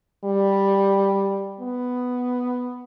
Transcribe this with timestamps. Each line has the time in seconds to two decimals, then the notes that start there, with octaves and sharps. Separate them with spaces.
0.25 G3
1.60 B3